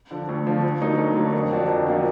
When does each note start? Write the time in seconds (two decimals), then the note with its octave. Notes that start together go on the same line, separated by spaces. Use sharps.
0.11 D3 F3
0.29 D2
0.46 D3 F3
0.63 D2
0.81 D3 F#3 A#3 D#4
0.98 D2
1.16 D3 F#3 A#3 D#4
1.33 F2
1.52 F3 A#3 D4 F#4
1.69 F2
1.86 F3 A#3 D4 F#4